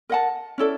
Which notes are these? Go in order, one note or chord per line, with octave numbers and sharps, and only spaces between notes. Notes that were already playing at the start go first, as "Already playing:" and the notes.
A#4 D#5 F#5 A5
C#4 E4 A4 D5